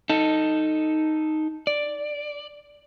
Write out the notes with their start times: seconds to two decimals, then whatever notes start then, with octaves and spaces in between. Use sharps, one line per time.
0.09 D#4 A4
1.67 D5